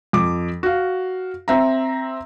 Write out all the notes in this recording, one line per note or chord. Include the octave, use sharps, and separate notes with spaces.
F2 D6
F#4 F5
C4 E5 A#5